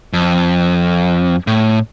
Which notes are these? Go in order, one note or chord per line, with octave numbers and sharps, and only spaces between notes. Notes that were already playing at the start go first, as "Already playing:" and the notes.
F2
A2